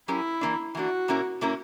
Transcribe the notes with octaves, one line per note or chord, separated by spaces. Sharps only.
F#3 C#4 E4 G4 A#4
E3 A#3 D4
E3 A#3 D4 F#4
A#2 A#3 C#4 E4 A#4
A#2 A#3 C#4 E4 A#4